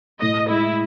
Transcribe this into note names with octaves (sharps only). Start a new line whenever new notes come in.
A2 D#5
G#3 E4